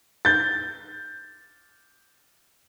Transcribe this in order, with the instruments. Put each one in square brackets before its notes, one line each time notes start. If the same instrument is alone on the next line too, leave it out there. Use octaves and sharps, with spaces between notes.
[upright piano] G6 A6